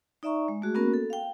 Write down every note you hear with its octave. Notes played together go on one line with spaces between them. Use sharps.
D#4 D5 E5 A#5 C#6
G#3
A3 F#4 G#4
A#3 B3 C#4 F#4 A#4
A4
F5 G5